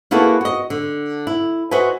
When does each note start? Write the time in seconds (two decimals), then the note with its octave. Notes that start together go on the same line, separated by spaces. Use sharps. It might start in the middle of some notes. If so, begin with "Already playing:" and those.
0.11 A#3 B3 E4 F#4 G#4 A4
0.41 F#4 D#5
0.70 D3
1.27 E4
1.71 F#4 B4 C5 D#5 E5 G#5